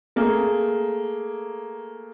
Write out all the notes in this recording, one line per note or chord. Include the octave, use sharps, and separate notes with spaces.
A3 A#3 G#4